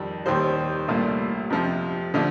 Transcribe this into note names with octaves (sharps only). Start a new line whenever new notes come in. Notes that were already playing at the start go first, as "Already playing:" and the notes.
Already playing: F2 D#3 G3
D#2 D#3 G3 C5
C2 A#2 A3
F2 C3 F3
D3 F3 A3